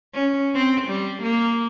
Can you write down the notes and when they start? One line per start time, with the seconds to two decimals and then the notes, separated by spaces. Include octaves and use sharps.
0.14 C#4
0.54 C4
0.88 G3
1.22 A#3